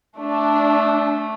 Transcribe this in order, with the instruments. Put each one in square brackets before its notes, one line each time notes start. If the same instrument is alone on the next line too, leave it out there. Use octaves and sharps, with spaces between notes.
[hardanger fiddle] A3 [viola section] D4